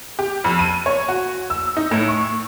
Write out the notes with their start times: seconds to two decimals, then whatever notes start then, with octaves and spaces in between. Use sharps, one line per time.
0.19 G4
0.44 F2
0.59 D#7
0.86 C#5
1.08 F#4
1.50 E6
1.77 D#4
1.91 A2
2.08 C#6